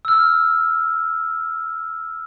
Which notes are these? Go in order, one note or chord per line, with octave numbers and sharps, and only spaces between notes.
E6 F6